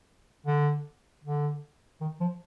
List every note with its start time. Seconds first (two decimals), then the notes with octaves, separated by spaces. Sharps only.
0.47 D3
1.24 D3
2.01 D#3
2.20 F3